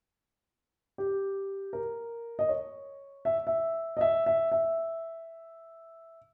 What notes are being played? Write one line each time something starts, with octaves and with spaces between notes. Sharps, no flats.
G4
A#4
D#5
C#5
E5
E5
D#5
E5
E5
E5